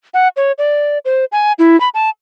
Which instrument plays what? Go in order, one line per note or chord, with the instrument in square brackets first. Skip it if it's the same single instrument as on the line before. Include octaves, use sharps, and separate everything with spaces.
[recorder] F#5
C#5
D5
C5
G#5
E4
B5
A5